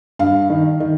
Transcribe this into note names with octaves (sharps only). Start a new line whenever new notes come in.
G2 F5
D#3
D#3